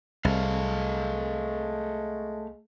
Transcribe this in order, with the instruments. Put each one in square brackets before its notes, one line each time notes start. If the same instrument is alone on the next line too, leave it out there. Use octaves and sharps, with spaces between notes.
[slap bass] C2 [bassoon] G#3 [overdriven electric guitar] A3 F5